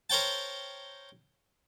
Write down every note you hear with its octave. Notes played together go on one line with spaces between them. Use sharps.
A#4 C5 C#5 G5 A5